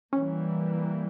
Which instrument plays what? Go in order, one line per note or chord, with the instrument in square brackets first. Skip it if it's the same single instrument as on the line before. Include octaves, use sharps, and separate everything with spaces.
[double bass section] E3 G3 A#3 [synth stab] C#4